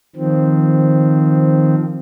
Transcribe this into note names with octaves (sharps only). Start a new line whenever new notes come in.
D#3 F3 C4